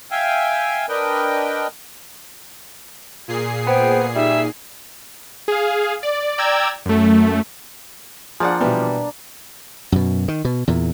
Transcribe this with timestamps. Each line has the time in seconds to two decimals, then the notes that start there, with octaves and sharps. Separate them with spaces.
0.11 E5 F5 G5 G#5
0.89 D4 A#4 B4 D#5 G5
3.28 A#2 G#4 C7
3.67 B3 C5 G5
4.15 G3 D#4 E5
5.48 G#4 F5
6.03 D5
6.38 D5 G5 A#5 E6 G#6
6.86 F#2 A3
8.40 F3 A#3 D4 G#4 D5 F#5
8.61 B2 E3 G3 B3
9.92 F#2 B2
10.28 D#3
10.45 B2
10.68 E2 A#2